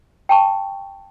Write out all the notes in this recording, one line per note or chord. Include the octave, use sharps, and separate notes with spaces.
G5 A5 C#6